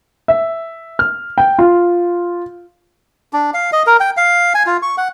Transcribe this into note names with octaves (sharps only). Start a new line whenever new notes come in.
E5
F6
G5
F4
D4
F5
D#5
A#4
G5
F5
G#5
F4
C#6
F#5